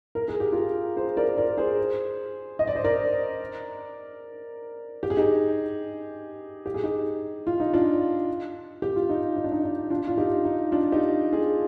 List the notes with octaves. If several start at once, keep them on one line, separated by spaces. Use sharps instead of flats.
A#4
G#4
G4
F4 G#4
G#4 C5
A#4 D5
A#4 D5
G#4 C5
D#5
D5
C5
A#4 D5
G4
G#4
D#4 G4
G4
G#4
D#4 G4
F4
D#4
D4 F4
G4
F4
D#4
D#4
D4
D#4
D#4
D4 F4
F4
D#4 G4
D#4
D4 F4
D#4 G4
F4 G#4